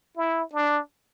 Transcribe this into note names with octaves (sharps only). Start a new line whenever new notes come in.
E4
D4